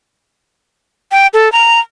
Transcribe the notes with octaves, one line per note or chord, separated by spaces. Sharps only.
G5
A4
A#5